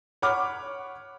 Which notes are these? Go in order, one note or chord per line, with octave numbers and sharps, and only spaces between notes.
C#5 F#5 B5 D6 F6